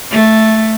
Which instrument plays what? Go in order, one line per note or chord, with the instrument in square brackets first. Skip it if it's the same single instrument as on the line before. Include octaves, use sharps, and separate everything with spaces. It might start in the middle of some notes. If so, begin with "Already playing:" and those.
[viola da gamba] A3